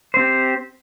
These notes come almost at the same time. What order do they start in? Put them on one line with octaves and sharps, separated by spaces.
C5 C4 G4